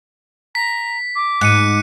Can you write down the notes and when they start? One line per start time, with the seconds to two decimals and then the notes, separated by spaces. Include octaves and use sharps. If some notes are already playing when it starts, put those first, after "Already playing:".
0.55 A#5 B6
1.16 D6
1.41 G#2 F#6 C#7 D#7